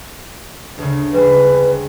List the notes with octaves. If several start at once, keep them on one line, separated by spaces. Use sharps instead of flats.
D2 C#3
G3 G#3 B4 C5